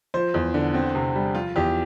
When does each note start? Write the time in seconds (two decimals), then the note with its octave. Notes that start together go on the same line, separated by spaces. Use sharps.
0.14 F3 C5
0.34 E2
0.54 D3
0.74 C4
0.95 C3
1.15 G3
1.35 F3 F4
1.56 E2 G4